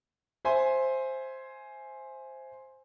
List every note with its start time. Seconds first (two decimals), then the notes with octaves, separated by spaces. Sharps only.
0.45 C5 E5 G#5 C6